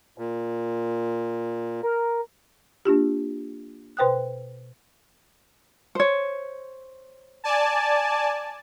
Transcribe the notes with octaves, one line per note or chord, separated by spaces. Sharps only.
A#2
A#4
A#3 D4 F4 G4
B2 B4 C5 G5 D#6 F#6
C5 C#5
D5 G#5 A5